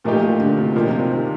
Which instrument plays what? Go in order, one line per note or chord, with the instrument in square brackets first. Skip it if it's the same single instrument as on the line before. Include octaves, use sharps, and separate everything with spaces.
[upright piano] A#2 F3 A#3 D#4 G4 [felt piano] A3
[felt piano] A3
D3
C3
[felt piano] A#2 [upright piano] F3 A#3 D#4 G4
[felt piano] C3
C3
D#3